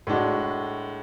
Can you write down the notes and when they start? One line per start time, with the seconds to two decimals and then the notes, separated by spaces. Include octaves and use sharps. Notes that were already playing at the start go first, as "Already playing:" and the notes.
0.07 A2 G#3 D4 F#4